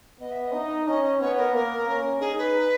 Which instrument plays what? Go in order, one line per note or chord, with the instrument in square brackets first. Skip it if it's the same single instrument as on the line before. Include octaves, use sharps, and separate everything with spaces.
[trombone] B3 [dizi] D#5
[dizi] E5
E5
D#5
[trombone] D#4
[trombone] C#4 [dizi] D#5
[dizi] D#5
[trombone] B3 [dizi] C#5
[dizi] A#4
[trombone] A#3 [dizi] A#4
[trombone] C#4
[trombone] D#4 [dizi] G#4
[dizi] B4